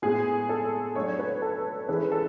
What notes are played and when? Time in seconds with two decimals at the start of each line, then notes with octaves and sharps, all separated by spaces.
0.02 A2 G#3 B3 G#4
0.49 A4
0.95 F#3 A3 D4 C#5
1.19 B4
1.42 A4
1.88 E3 G#3 C#4 G#4 B4
2.12 A4